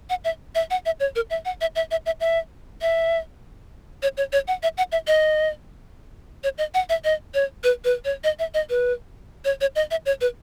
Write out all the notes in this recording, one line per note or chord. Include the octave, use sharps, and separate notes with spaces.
F#5
E5
E5
F#5
E5
C#5
A#4
E5
F#5
E5
E5
E5
E5
E5
E5
C#5
C#5
C#5
F#5
E5
F#5
E5
D#5
C#5
D#5
F#5
E5
D#5
C#5
B4
B4
C#5
D#5
E5
D#5
B4
C#5
C#5
D#5
E5
C#5
B4